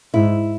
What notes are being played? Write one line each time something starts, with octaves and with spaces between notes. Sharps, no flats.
G#2 E4